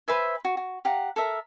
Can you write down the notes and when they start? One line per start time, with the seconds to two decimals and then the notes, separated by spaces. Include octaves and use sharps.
0.08 B4 C5 E5 G#5
0.45 F#4
0.57 F#4
0.85 G4 F5 F#5 A#5
1.16 A4 A#4 E5